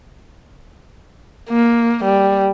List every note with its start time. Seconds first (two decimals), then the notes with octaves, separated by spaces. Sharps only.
1.50 A#3
2.04 G3